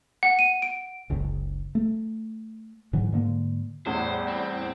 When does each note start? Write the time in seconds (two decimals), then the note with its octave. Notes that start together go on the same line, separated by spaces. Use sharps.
0.23 F#5
0.39 D#7
0.62 D7
1.10 F#1 C#2
1.75 A3
2.93 G#2 D3 E3 F#3
3.12 G#2 D3 A#3
3.86 E2 A2 G3 C5
4.28 C4